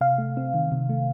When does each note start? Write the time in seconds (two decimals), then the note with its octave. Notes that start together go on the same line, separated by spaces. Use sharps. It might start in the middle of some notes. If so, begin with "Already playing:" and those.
0.01 C3 F5
0.18 A3
0.37 C4
0.54 D#3
0.72 C3
0.89 A3